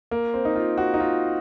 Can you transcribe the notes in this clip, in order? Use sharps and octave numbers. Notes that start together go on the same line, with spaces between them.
A#3
C4
D#4
F4
F#4
D#4
F4